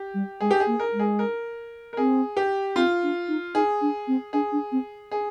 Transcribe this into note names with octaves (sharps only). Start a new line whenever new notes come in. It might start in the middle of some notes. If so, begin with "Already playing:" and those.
Already playing: G4
G3
G#3 G#4
G4
G#4
A#3
A#4
G#3
G#4
A#4
A#4
C4 G#4
G4
C4 F4
D4
D#4
D#4 G#4
D4
C4
D4 G#4
D4
C4
G#4